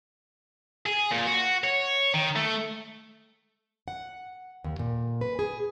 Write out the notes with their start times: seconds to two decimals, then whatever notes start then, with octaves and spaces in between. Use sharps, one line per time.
0.86 G#4
1.11 A#2
1.27 F#4
1.64 C#5
2.14 D#3
2.36 A3
3.88 F#5
4.64 D#2
4.79 A#2
5.21 B4
5.39 G#4